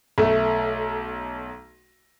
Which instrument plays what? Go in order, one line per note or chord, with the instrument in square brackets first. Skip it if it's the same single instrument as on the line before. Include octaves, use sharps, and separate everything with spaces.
[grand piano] B1 A3